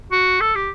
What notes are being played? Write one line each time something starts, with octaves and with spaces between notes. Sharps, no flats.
F#4
A4
G4